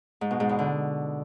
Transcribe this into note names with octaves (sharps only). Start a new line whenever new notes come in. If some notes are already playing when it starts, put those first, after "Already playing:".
G#2
B2
G#2
E2
D3